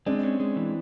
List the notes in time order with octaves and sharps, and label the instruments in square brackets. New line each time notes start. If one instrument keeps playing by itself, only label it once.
[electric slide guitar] G#3 [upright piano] C4 D4
[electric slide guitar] C#4
G#3
E3